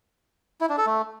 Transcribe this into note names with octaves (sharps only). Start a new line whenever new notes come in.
E4
D4
A4
A3